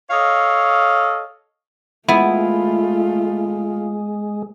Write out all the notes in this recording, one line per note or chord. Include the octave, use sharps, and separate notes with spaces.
A4 C#5 D#5 F5
G#3 A3 B3 E4 F4